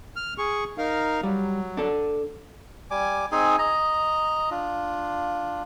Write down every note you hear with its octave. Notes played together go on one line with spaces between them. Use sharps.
F6
G#4 C#6
D#4 A#4 F5
F#3 G3
D4 A4
G3 G#5 D6
C4 D#4 G#4 G#5
D#5 A#5
D4 F4